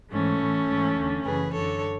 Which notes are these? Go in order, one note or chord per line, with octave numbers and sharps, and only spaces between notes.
G#2 E3 A3 C#4
A2 E3
G#2 E3
E2 D3
F#2 C#3 E3 G#4 B4
F#2 D3 A4 C#5